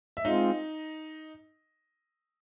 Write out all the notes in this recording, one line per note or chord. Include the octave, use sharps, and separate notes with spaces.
E5
G#3 C4 D#4 F4 D#5